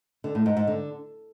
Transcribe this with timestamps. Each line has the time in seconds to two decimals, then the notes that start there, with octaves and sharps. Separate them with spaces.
0.24 D3
0.35 A2
0.46 G#2
0.57 G#2
0.67 D3